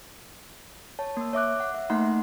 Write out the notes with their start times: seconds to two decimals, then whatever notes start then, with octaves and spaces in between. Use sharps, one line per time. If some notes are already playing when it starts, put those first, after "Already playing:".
0.99 C#5 A5
1.17 A#3 E6
1.33 C#5 E5 D6 F#6
1.60 F#5
1.74 E5
1.90 A3 A#3 D#4 F#5 A#5 C6